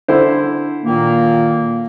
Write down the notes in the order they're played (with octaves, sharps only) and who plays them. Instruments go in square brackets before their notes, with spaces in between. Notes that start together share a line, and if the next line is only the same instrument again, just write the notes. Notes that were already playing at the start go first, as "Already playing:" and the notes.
[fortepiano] D3 E4 C5
[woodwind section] A#2 D#3 A#3